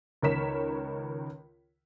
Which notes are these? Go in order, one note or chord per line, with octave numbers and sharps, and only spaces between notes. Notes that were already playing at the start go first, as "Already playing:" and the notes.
C#2 D#3 A#4 C#5 B6 E7